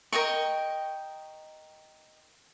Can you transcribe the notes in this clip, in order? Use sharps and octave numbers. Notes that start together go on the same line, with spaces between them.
A#4 D#5 G5 C#6